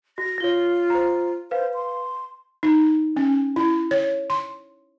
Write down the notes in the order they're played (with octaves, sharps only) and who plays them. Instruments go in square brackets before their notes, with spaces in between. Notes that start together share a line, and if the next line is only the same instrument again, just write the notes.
[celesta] F#4 [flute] A#6
[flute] F4 [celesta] C#5 G7
[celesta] C5 A#5
[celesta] B4 F5 [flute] C5
[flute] C6
[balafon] D#4
C#4
E4
C#5
C6